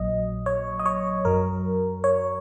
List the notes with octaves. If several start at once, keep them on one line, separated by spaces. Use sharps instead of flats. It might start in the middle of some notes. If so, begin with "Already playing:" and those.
Already playing: A#1 A#2 F#3 D#5
C#5
D#5
C#5
F#2 F#3 A#4
C#5